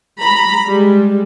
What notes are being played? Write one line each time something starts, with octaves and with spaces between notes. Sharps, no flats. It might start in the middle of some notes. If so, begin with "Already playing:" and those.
A#5 B5
G3 G#3